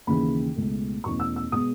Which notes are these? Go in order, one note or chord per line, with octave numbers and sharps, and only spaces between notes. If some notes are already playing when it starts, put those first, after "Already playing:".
D#2 C#3 E3 B5
C#2 B2 A3
E2 B2 A3 C#4 C#6
E6
E6
B2 G#3 B3 D#6